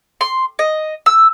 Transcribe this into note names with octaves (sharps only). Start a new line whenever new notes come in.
C6
D#5
E6